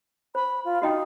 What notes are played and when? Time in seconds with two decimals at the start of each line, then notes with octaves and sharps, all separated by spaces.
0.35 C5 B5
0.64 F4
0.82 D#4 F#4 D#5 G5